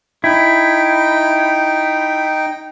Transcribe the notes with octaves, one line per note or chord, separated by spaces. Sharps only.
D#4 E4 G5